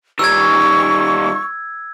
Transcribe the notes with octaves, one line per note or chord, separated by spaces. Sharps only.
D#3 G3 C#6 E6 G#6